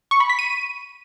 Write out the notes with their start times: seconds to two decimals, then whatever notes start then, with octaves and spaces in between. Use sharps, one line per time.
0.11 C#6
0.20 B5
0.30 B6
0.39 D#7